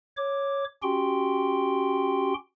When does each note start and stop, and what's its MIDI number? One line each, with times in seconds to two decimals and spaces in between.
0.17 0.64 73
0.17 0.64 86
0.83 2.34 61
0.83 2.34 66
0.83 2.34 67
0.83 2.34 79
0.83 2.34 84